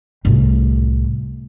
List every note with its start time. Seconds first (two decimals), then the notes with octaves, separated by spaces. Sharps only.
0.25 C2 A2